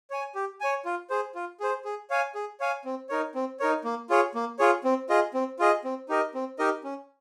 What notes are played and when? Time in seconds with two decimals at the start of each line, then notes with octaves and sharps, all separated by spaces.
0.10 C#5 G#5
0.35 G4
0.60 C#5 G#5
0.85 F4
1.10 G#4 C5
1.35 F4
1.60 G#4 C5
1.85 G#4
2.10 C#5 F5 G#5
2.35 G#4
2.60 C#5 F5 G#5
2.85 C4
3.09 D#4 A#4 C#5
3.35 C4
3.60 D#4 A#4 C#5
3.85 A#3
4.10 F4 G#4 C#5
4.35 A#3
4.59 F4 G#4 C#5
4.84 C4
5.09 F4 G#4 D#5
5.34 C4
5.59 F4 G#4 D#5
5.84 C4
6.09 D#4 G4 A#4 D#5
6.34 C4
6.59 D#4 G4 A#4 D#5
6.84 C#4